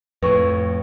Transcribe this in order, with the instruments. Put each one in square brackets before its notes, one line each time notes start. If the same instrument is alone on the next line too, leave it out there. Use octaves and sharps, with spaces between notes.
[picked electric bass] F2 A2 [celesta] B4 C#6